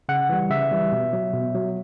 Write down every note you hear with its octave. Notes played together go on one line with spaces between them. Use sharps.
C#3 F#5
E3 G3
C#3 E5
E3 G3
B2
F#3
B2
F#3